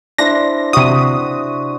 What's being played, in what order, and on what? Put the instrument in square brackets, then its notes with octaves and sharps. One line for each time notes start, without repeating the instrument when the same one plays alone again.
[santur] D4 E4 C5 [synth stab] A#6
[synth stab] C3 D#6 [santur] F#4 E5